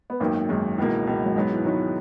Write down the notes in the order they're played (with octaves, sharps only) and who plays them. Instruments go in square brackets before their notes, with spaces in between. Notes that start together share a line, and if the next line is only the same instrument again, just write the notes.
[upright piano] B3
[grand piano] G#1 F#2 D#3 [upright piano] A#3
[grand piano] G#1 F#2 D#3 [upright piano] G#3
[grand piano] C#2 B2 A#3 [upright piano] E3
[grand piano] C#2 B2 A#3
[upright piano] F#3
[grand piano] G#2 F#3 B3 [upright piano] G#3
[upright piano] E3
[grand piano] G#2 F#3 B3 [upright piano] D#3